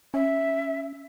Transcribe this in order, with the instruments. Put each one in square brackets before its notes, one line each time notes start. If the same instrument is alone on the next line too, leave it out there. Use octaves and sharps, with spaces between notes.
[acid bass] C#4 [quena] E5